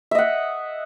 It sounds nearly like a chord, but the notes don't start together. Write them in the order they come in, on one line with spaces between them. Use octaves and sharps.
E5 D#5 F#5